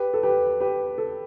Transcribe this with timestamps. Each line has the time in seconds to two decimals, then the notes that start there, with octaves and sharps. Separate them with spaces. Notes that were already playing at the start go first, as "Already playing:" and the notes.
Already playing: G4 B4
0.14 A4
0.23 G4 B4
0.60 G4 B4
0.98 A4